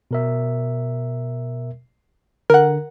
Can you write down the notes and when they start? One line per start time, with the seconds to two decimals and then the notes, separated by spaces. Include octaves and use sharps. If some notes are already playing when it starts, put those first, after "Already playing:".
0.11 B2 A#4 E5
2.50 D3 A#4 F#5